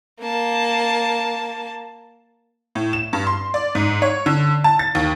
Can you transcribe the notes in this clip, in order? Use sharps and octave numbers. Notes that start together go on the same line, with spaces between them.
A#3 A5
A2
E7
G2
C6
D5
G#2
C#5
D3
A5
A6
D#2